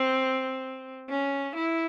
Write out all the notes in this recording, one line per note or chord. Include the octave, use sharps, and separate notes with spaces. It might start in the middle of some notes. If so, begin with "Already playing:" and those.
Already playing: C4
C#4
E4